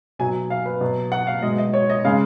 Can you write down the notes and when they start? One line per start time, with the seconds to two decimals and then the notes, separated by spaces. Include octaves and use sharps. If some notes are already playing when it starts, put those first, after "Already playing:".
0.19 B2 F#3 G#5
0.50 F5
0.66 B4
0.81 B2 F#3
1.12 F#5
1.27 F5
1.42 B2 G#3 D#5
1.58 D#5
1.73 C#5
1.90 D#5
2.04 C#3 G#3 F5